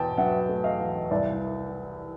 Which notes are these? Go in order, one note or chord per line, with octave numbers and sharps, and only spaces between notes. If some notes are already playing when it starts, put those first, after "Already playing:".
Already playing: E2 B2 G5 A5
F#3 E5 F#5
A3
D#5 F5
E2
C2 D5 E5